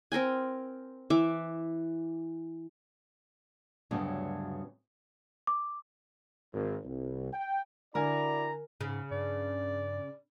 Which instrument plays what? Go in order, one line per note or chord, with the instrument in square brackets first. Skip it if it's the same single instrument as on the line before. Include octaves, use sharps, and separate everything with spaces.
[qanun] C4 A#4 G5 G#5
E3 E5 D6
[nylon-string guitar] D2 G2 C#3 F#3 B3 D4
[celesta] D6
[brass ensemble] G#1
C2
G5
[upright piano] D3 G#5 [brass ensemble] E4 F#4 D5 [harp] A#4 [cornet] A#5
[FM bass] G#2 [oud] C#3
[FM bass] G2 [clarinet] D5